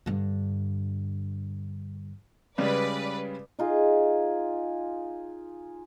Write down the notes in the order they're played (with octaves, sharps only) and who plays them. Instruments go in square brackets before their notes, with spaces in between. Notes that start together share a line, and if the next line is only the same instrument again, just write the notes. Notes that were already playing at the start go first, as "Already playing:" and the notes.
[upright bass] G2 D3
[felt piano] C#3 G3 G#3 [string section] B4 D5
[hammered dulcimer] D#4 F4 G#4